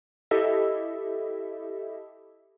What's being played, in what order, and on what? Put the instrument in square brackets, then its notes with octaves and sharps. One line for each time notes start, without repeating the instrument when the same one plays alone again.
[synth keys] E4 G4 A4 D#5 E5